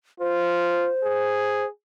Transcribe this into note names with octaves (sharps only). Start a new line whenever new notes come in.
F4 C5
G#4